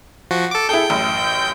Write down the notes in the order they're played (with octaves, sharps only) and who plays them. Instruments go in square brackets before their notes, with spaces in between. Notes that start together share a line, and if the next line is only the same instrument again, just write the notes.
[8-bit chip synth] F3 F#4
A4 D6
[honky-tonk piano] E4 G#4 A4 [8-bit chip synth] G5 G6
[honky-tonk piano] A1 F#2